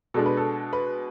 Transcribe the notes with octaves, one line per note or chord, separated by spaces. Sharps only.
B2 G#3 D4 A4
B4
A4
B4